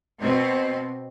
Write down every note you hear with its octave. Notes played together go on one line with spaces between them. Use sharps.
B2 C4